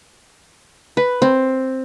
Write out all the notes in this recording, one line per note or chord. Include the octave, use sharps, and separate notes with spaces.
B4
C4